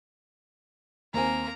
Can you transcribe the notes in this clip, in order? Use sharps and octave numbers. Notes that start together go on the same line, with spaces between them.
D#2 A#3 C4 G#5 A#5